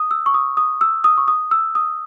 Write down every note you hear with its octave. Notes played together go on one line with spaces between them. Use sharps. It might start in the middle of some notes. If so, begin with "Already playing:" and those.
Already playing: D#6
E6
C#6
D#6
D#6
E6
D#6
C#6
D#6
E6
D#6